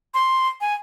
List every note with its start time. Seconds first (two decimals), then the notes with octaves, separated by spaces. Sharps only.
0.14 C6
0.61 G#5